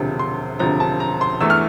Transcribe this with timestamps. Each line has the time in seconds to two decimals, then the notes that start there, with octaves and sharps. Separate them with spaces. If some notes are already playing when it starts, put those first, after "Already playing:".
Already playing: E1 D2 C3 F3
0.19 C6
0.59 E1 D2 C3 F3 A#5
0.80 A5
1.00 A#5
1.21 C6
1.41 E2 E3 A3 E6
1.50 F6